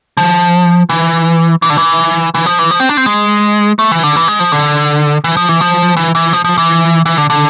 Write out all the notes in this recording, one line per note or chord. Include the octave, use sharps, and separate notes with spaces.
F3
E3
E3
D3
E3
E3
F3
E3
F3
C4
D4
C4
G#3
A3
E3
D3
E3
G#3
F3
D3
E3
F3
E3
F3
E3
E3
F3
F3
E3
E3
D3
D3